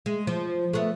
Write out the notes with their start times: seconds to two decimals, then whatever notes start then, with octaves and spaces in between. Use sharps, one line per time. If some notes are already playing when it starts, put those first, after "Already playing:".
0.06 G#3
0.27 F3
0.73 A3 B3